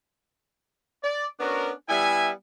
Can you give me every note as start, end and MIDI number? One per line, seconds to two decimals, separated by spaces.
1.03 1.26 74
1.40 1.71 59
1.40 1.71 61
1.40 1.71 62
1.40 1.71 66
1.40 1.71 70
1.89 2.30 55
1.89 2.30 59
1.89 2.30 64
1.89 2.30 76
1.89 2.30 80